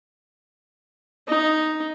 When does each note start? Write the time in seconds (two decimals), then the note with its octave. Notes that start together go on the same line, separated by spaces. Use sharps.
1.28 D#4